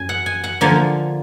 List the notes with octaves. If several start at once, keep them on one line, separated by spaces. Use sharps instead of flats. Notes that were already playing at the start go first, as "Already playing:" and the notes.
Already playing: F#2 G#5
F#5
G#5
F#5
D3 F3 A#3 G#5